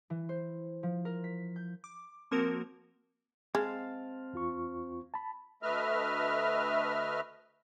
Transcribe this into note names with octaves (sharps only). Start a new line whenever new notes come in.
E3
C5
F3
A#4
B6
G6
D6
F3 A#3 C4 F#4 A#4
G#3 C4 F5 A5
E2 F4 C#6
A5 B5
D2 A3 B4 D#5 E5 F6